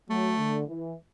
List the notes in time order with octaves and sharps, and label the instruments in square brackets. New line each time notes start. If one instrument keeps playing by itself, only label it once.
[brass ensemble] F#3 [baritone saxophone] A3
[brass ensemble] D3
E3